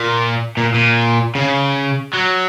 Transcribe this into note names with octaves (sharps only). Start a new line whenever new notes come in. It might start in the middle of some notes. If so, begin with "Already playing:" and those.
Already playing: A#2
A#2
A#2
C#3
F#3